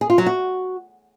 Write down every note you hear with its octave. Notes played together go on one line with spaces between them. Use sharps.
G#4
F4
F#3
F#4